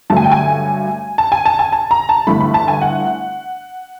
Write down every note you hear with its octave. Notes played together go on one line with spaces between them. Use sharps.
G2 D3 F#3 A3 A5
G#5
G5
G#5
A5
G#5
A5
G#5
A5
A#5
A5
G1 G2 E3 A3 B5
B5
A5
G#5
F#5